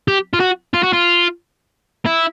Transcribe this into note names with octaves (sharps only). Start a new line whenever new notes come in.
G4
F4
F#4
F4
F#4
F4
E4